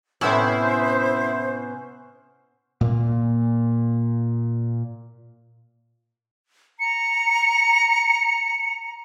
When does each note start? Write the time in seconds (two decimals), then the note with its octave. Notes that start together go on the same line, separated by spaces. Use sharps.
0.21 A2 C3 B3 C#4 E4 C5
2.81 A#2 A#3
6.80 A#5 C#7